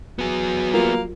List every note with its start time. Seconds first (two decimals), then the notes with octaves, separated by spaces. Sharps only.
0.19 F#3 B3 G#4
0.74 G3 A#3 F4 A#4